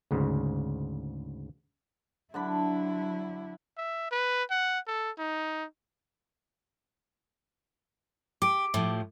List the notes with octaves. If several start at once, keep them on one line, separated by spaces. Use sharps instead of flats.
D2 G#2 C#3
D3 F#3 D4 E4 B5
E5
B4
F#5
A4
D#4
G4 D6 D7
A2 F3